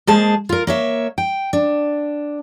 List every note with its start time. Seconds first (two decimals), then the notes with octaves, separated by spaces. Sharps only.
0.07 G#3 A#3 G#4 C5 A5
0.49 F4 A#4
0.67 A#3 C#5 E5
1.18 G5
1.53 D4